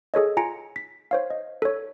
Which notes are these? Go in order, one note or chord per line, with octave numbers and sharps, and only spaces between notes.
G#4 A4 C#5 D#5
F4 G#5 A#5 A#6 C#7 D7
B6
C5 C#5 F5
D#5
A4 C#5